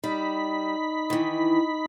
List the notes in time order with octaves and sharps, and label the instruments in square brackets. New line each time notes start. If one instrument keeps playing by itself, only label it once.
[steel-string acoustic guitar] G3 [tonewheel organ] D#4 B5
[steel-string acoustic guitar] D#3 E3